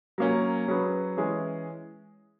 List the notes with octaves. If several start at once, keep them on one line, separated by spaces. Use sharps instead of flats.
F#3 A#3 C#4
F#3 C#4 G#4 B4
E3 G#3 C#4 G#4